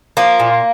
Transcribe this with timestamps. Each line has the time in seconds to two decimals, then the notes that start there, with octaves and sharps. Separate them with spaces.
0.17 F3 A#3
0.40 A#2